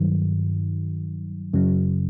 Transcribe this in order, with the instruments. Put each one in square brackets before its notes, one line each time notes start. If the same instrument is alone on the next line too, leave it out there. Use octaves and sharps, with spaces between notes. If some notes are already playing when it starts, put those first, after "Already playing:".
Already playing: [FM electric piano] G2 D#3 F#3
F#2 C#3 F#3